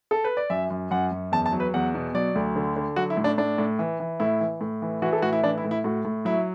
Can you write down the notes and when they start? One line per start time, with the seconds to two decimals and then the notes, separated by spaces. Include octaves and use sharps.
0.11 A4
0.24 B4
0.37 D5
0.50 F#2 E5
0.70 F#2
0.91 F#2 F#5
1.12 F#2
1.32 E2 A5
1.46 A5
1.52 F#3
1.60 B4
1.74 E2 F#5
1.95 B2
2.14 F#3 D5
2.35 D2
2.56 D3
2.76 D3
2.96 F#3 F#4
3.10 E4
3.17 A2
3.24 D4
3.38 A2 D4
3.58 A2
3.79 E3
4.00 E3
4.20 A2 E4
4.40 E3
4.61 A2
4.82 E3
5.02 E3 F#4
5.13 A4
5.22 A2 F#4
5.33 E4
5.43 E3 D4
5.58 E4
5.64 A2
5.71 E4
5.84 A2 F#4
6.05 A2
6.25 F#3 E4